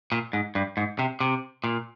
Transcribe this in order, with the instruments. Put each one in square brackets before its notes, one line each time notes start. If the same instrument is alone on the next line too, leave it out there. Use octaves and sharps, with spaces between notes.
[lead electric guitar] A#2
G#2
G2
G#2
C3
C3
A#2